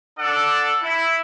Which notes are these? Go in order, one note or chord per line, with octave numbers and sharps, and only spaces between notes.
D4 A4 D5 F#5
E4